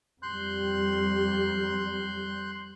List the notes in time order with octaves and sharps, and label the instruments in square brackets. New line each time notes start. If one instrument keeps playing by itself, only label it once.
[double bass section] F2 G3 [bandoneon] C6 F#6 G6